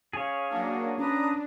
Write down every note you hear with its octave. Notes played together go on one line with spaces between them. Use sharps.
C#4 G#4 C#5 F5
F#3 A#3 D4
C#4 D4 B4 A#5 D#6